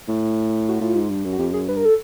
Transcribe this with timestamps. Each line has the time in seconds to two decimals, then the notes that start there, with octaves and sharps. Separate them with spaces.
0.08 A2
0.69 F#4
0.81 A2 F4
0.95 G#2
1.10 G2
1.25 F#2
1.33 F#4
1.39 F2 G4
1.53 F#2 G#4
1.68 G2 B4
1.77 A#4
1.85 A4